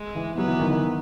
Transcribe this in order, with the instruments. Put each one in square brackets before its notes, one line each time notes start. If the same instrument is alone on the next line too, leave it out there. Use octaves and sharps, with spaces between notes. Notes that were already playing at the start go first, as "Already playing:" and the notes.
Already playing: [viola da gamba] G#3
[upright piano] E3
[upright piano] F#3 [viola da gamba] B3
[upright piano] E3
D#3
D#3